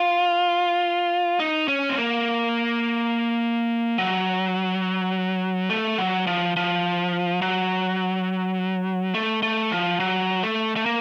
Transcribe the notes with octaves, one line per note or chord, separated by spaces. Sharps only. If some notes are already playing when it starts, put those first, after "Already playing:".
Already playing: F4
D#4
C#4
C4
A#3
F#3
A3
F#3
F3
F3
F#3
A3
A3
F3
F#3
A3
A3
A#3